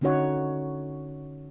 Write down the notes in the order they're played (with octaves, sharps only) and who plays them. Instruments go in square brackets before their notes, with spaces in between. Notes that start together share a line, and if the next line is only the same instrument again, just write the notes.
[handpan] D3 C#4 D#4 F#4 C#5 F#5